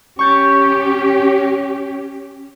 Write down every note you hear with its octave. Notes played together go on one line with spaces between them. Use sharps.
C#4 G4 C#6 G6 A6